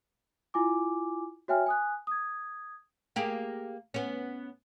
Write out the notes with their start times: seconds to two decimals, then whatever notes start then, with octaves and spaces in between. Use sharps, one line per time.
0.54 E4 F4 G#5 D6
1.48 F#4 C#5 E5 G5 G#5 F6
1.66 G#5 D#6 F#6
2.07 D#6 G#6
3.16 A#3 G4 G#4
3.94 B3 C#4